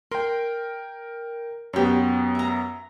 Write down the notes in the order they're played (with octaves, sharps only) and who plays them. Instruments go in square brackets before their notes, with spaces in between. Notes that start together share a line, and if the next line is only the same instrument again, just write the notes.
[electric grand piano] A#4 G5 [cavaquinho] C6
[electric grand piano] F#2 B3 [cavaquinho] G4 C#5
[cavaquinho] E5 A#5